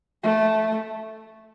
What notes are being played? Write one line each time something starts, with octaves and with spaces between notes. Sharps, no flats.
A3